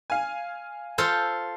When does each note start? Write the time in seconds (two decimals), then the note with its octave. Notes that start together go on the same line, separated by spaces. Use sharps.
0.10 F5 G#5
0.98 F4 A4 C5